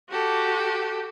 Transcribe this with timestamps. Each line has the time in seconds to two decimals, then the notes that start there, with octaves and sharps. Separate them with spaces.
0.10 F#4 G4 A4